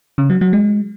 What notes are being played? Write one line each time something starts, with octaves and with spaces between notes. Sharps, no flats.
C#3
F#3
F#3
G#3